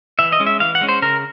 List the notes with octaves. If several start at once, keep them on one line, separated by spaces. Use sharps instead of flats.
E3 E5
D#5
G#3 C#4
E5
E3 F5
F#5
G#3 C#4
C5
C#3 A#4